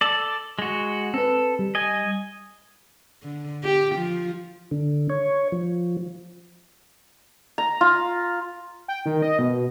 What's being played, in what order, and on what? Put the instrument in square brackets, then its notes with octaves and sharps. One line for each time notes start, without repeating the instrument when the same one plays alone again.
[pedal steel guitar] A4 D5
G#3 F#4
[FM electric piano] C4 B4 [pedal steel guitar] A4
[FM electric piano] G3
[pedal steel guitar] D#5 G#5
[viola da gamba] D3
G4
F3
[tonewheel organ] D3
C#5
F3
[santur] A#5
F4
[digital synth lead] G5
D#3
D#5
B2